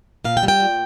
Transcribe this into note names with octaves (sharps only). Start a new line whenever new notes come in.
A#2 F5
G5
G3
G5
A#2